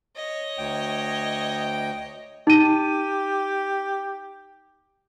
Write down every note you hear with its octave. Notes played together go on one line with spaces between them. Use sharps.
C#5 D#5
D2 G5
D#4 G4 D#7